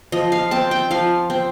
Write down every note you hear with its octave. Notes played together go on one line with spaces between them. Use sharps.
F3 D#5
F5
C4 A5
G5
F3 F5
C4